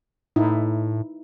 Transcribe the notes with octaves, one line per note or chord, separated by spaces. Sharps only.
A2 D#4 E4